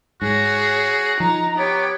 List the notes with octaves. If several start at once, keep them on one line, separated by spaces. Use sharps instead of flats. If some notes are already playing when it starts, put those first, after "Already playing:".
G#2 F#4 G#4 C#5
F3 D#4 A#5
B3 G4 C#5